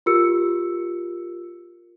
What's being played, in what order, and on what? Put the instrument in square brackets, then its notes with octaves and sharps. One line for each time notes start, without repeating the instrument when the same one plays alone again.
[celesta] F4 G4 A#4 E6 C#7